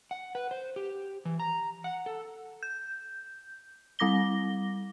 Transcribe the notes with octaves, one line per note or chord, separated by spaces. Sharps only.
F#5
B4
C5
G4
E3
A#5
F#5
A4
G6
G3 C4 D6 A#6 G7